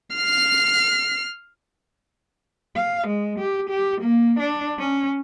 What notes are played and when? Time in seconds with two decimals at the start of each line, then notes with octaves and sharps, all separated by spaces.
0.16 F6 C7
2.76 F5
3.07 G#3
3.39 G4
3.70 G4
4.01 A#3
4.40 D4
4.79 C#4